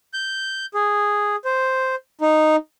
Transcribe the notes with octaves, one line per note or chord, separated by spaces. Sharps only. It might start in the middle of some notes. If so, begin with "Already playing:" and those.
G6
G#4
C5
D#4